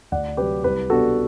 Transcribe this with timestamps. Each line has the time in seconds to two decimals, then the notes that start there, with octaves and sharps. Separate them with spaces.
0.12 D2 D5 F#5
0.37 C3 G4 B4
0.41 F#3
0.64 C2 G4 B4
0.90 B2 G3 B3 D4 F#4 A4